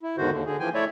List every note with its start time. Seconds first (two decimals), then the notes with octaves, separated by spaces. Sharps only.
0.03 E4
0.18 E2 G#2 D3 D#3 F#4 C5
0.31 D#2 D3
0.46 D3 G#4
0.60 E3 F3 G5 G#5
0.74 A3 E4 C#5 D5 E5